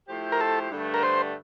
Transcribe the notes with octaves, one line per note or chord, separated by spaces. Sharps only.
F3 A3 E4 G4 C5
A#4
A4
G2 D3 A3
A#4
C5